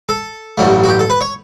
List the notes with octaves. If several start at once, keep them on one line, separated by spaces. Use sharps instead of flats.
A4
A1 G2 F#3 A3
F#4
G4
A4
B4
C#5